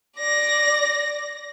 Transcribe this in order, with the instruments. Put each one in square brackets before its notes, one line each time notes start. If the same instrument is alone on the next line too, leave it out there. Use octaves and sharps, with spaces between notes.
[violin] D5 A#6